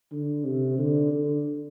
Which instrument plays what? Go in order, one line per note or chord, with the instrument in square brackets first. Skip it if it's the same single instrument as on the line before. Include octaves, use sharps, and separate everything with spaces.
[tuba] D3
C3
D3
D3